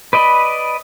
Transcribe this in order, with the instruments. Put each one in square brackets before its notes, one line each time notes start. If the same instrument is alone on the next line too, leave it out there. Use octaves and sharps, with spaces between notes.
[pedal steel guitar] B4 D5 D#5 B5